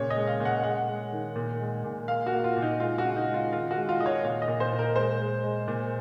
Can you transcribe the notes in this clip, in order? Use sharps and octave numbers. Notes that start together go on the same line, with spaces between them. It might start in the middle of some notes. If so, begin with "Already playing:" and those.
Already playing: A#2 C#3 C#5
G#3 D#5
F5
A#2
F#5
G#3 F#5
G#3
D#3
A#2
G#3
A#2
A#3 F5
F#4
A#3
F4
A#2
D#4
G#3 F4
F#4
C#3
D#4
G#3
F4
D#3 F4
F#4
G#3
F4
D#3 D#5
C#5
A#2 F5
D#5
A#2
C5
A#2
A#4
G#3 C5
G#3
G#3
A#2